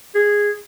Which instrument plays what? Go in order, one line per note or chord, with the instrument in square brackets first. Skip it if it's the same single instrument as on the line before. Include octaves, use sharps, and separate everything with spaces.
[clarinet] G#4